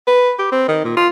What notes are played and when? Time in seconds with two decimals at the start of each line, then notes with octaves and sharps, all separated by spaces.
0.07 B4
0.39 G4
0.52 C4
0.68 D#3
0.85 A#2
0.97 F4